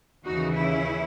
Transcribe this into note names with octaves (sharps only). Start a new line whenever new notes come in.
D#2 C#3 E3 D#4 F#4
C#4 E4